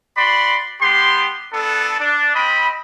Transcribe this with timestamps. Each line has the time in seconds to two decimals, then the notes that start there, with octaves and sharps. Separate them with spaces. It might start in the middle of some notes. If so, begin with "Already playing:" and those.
0.17 F#4 D5 B5 C6
0.81 G3 B3 G4 C6
1.53 B3 D4 A4
1.99 D4
2.34 C4 D#5 B5